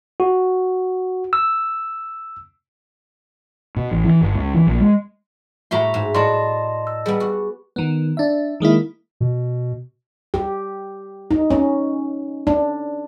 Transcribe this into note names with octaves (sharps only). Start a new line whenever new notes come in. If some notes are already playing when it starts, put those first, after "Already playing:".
F#4
E6
B2
A1
E3
G1
C#2
E3
A#1
G#3
A2 A3 F#4 E5 A#5 C6
G#2
A2 D5 D#5 F#5 A5 A#5 C6
E6
G3 B3 G#4
F#4
D#3 B3
D4 E5
D#3 G#3 A#3 E4
B2
G4
D#4
C#4
D4